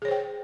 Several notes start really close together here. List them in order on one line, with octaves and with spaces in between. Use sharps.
G#4 C#5 C5 G5